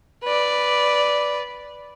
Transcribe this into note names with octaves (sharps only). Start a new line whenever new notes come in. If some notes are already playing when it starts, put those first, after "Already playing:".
B4 D5